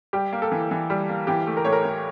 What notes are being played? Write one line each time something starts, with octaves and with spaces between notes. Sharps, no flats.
G3 G4
A#3
A4
E3
E3
G3
A#3
E3 G4
A3
A#4
A2 C#5
A#4
A2